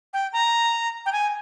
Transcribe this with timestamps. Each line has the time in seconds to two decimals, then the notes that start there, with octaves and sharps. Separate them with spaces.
0.14 G5
0.33 A#5
1.06 G5
1.13 G#5